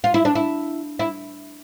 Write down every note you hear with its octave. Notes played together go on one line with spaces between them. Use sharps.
F4
E4
D4
E4
E4